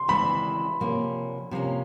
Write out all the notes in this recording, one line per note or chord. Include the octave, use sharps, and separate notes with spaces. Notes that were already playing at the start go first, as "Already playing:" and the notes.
Already playing: C6
C#3 E3 G#3 C4 E4 B5
C3 F3 A#3 C#4
C3 F3 A#3 C#4